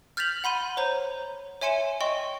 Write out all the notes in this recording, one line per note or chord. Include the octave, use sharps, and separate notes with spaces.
F6 G6 A6 B6 F7 F#7
F#5 B5 C6 D#7
C5 C#5 A#5 G6
C#5 E5 G#5 C6 C#7 E7
D#5 G5 C6 C#6